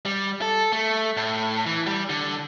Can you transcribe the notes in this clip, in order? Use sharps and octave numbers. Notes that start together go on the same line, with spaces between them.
G3
A4
A3
A2
E3
G3
D3